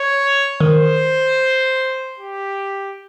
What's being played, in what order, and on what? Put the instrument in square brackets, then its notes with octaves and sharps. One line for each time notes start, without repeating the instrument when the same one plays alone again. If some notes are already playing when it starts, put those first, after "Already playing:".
Already playing: [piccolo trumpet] C#5
[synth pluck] D#3 [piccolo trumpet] C5
[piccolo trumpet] G4